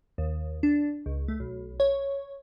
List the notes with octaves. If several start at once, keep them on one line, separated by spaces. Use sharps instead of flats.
D#2
D4
C#2
A3
B1
C#5